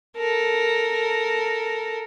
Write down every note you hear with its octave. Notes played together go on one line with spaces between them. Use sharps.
A4 A#4